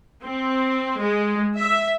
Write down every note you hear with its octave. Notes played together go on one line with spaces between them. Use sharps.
C4
G#3
E5